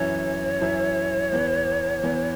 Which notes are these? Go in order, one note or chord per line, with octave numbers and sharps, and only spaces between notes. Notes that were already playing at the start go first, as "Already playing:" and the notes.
Already playing: F#2 E3 C#4 E4 C#5
F#2 E3 C#4 E4
E2 E3 B3
E2 E3 B3